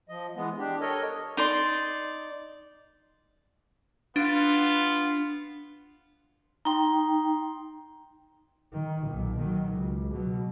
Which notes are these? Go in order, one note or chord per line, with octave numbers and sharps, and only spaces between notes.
F3 D#5
E3 G#3 B3
D4 G4
A4 A#4 C#5 D#5
D#4 D5 C6
B3 D4 F4
D#4 G5 A#5 C6
D#3
B1 A#2
D#3 F#3
C#2
B2 F#3